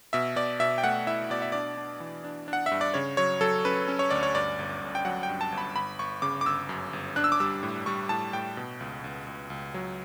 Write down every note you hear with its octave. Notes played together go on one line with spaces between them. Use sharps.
B2 E5
B2 D5
B2 E5
G5
A3 F#5
E4 E5
B2 D5
E5
D4 D5
D4
E3
D4
D4
F#5
E5
G2
D5
C#3 C#5
F#3 C#5
F#3 A4
C#4 B4
C#4
C#5
D2 D5
C#5
G2 D5
G1
G1
G5
F#3 F#5
G5
G2
A5
G1
B5
G1 B5
G1 C#6
C#3 D6
D6
G1 E6
F#2
G1
D4 F#6
E6
D6
G3 E6
A2
G3 C#6
A2 A5
A2 G5
B2
C#2
C#2
C#2
C#2
F#3